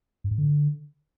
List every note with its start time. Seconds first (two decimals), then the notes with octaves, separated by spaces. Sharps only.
0.24 G2
0.31 G#2
0.38 D3